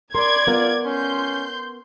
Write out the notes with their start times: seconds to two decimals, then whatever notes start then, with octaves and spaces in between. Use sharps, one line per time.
0.15 A#4 D5 C6 G#6
0.47 B3 F4 A#4
0.86 C#4 C6 G6